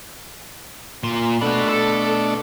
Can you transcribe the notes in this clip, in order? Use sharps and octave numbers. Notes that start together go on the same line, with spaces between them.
A#2 C6
B2 A3 D4 F#4 B5
A4